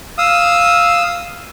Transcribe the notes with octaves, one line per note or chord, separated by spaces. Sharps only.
F5 D#6 E6